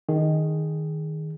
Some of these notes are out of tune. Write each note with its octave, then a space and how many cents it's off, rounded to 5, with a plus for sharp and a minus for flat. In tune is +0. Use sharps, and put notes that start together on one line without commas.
D#3 +0 G#4 +0